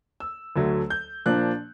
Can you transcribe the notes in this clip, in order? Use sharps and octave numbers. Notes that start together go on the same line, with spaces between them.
E6
D2 D3 F#3 A3
G6
A#2 F3 A#3 D4 F#6